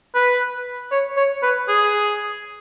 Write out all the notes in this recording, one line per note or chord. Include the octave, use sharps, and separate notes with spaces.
B4
C#5
C#5
B4
G#4